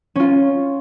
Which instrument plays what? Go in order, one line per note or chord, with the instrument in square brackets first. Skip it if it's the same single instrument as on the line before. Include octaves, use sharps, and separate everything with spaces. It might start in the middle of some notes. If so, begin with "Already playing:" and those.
[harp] C#4 F4